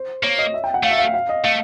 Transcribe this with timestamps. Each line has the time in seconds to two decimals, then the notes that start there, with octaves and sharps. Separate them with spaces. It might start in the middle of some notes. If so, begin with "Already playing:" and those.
Already playing: C5
0.23 A#3 C#5
0.39 D#5
0.54 E5
0.64 G5
0.74 F#5
0.83 A3 F5
0.91 E5
0.98 F5
1.14 F5
1.29 D#5
1.44 A3 F5